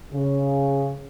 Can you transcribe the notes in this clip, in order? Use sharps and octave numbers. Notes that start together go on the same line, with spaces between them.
C#3